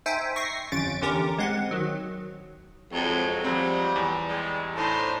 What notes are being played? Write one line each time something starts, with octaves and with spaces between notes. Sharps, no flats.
D#4 C5 E5 G5 G#5
C#6 A#6 C7
G1 F2 C#4 A6 D7
E2 D3 C#4 G4 A#4 D6
G#3 C4 F#5
D#3 F#3
F2 F#3 G#3 D#4
F3 G3 C4
E2
G3 G#3
A2 D4 D#4 C5